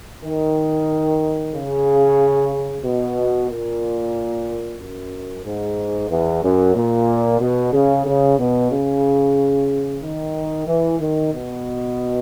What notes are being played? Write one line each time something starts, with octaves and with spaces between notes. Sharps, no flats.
D#3
C#3
B2
A#2
F#2
G#2
E2
F#2
A#2
B2
C#3
C#3
B2
C#3
D#3
E3
D#3
B2